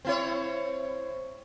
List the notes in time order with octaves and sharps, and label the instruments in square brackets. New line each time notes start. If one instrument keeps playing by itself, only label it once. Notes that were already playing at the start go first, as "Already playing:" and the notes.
[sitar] C4 E4 C#5